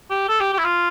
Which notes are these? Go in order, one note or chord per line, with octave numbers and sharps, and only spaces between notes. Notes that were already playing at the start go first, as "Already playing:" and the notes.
G4
A4
G4
G4
E4
F4